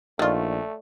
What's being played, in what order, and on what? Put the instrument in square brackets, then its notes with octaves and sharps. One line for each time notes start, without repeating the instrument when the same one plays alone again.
[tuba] A#1 [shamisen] D#3 F4 [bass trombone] A3 [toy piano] C#5 D5 C#6